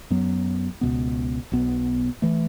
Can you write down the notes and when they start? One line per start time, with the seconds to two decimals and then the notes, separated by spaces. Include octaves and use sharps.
0.10 F#2 F#3 B3
0.81 C#2 B2 B3
1.52 B1 B2 B3
2.22 E3 A3